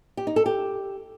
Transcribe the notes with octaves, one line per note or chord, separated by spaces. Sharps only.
G4
D#4
A4
G4